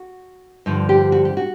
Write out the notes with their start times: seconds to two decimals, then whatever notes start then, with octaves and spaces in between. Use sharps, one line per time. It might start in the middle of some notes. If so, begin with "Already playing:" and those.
Already playing: F#4
0.66 G2 D3 F3
0.89 G4
1.12 F#4
1.25 G4
1.37 F#4